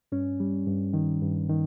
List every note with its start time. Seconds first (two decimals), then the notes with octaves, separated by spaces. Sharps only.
0.12 G2 C#4
0.40 G3
0.67 G2
0.93 D#3
1.22 G2
1.49 D#3